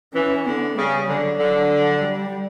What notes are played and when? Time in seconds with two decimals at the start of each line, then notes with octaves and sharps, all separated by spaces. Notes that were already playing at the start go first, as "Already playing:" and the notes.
0.14 E3 C#4
0.46 D3 B3
0.76 C#3 G3
1.07 D3 F#3
1.39 D3
2.01 G3